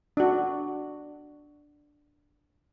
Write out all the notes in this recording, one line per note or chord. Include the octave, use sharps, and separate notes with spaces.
D4 F#4